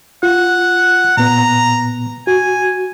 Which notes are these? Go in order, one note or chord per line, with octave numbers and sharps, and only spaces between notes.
F4 F#5
A#2 B3 A#5
F#4 G#5